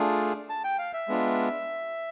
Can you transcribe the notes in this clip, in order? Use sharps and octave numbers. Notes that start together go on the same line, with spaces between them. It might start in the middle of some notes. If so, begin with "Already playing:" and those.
Already playing: A3 D4 F4 G#4
A5
G5
F5
E5
G#3 B3 D4 F4